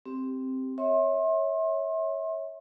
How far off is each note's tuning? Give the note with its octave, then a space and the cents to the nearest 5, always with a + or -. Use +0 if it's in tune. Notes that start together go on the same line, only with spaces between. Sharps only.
C4 +0 G4 +0
C#5 +0 E5 -30 C6 +35